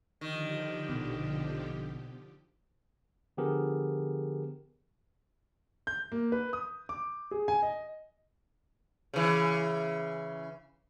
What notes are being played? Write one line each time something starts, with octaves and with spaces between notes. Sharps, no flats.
D3 D#3 F3 G4
A#1 B2
D3 F3 B3 G4 G#4 A#4
G6
A#3
B4
D#6
D6
G#4
G#5
D#5
C#3 E3